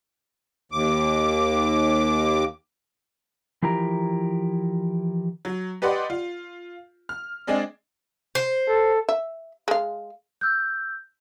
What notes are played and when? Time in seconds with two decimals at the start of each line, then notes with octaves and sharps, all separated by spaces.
0.72 D#2 D6
3.63 E3 F3 E4 G4 A#4 A#5
5.45 F#3
5.82 G4 B4 D5 D#5 F#5 C6
6.10 F4
7.09 F6
7.47 G#3 C4 D4 G#4 D5 D#5
8.35 C5
8.68 A4
9.09 E5
9.68 G#3 F5
10.41 E6 F#6 G6